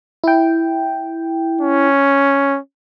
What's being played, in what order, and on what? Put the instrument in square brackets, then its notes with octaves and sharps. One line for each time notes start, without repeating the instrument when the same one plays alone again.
[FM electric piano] E4 G5
[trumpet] C#4